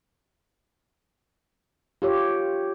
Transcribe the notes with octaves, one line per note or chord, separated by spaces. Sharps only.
F4 G4 C#5